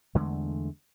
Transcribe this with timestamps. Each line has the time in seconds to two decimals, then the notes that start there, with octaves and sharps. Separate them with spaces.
0.15 E2 D3 G#3 A3